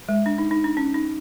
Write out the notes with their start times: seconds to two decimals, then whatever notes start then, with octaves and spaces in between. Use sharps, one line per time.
0.09 G#3
0.26 D4
0.38 D#4
0.51 D#4
0.64 D4
0.77 C#4
0.94 D#4